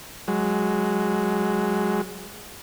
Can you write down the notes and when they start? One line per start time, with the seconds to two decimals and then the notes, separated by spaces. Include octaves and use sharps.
0.28 F#3 G#3